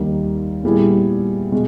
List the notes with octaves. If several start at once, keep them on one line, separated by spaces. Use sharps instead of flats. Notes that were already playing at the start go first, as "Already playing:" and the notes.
Already playing: D#2 D#3 G3
A#2 G3 B3 E4 G#4
B2 G#3